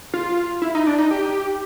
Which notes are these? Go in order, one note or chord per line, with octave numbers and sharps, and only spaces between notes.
F4
E4
D#4
D4
D#4
G4